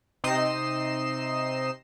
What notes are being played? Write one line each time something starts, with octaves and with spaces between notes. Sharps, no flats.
C3 C4 D#4 D#5 C7 E7